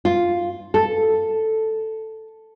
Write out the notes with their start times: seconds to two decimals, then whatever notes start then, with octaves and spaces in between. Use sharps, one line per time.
0.05 F4
0.74 A4